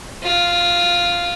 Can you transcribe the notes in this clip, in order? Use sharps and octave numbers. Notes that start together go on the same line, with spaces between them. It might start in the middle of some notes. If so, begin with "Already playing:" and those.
F4